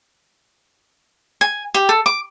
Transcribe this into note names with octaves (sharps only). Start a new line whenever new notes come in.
G#5
G4
A4
D6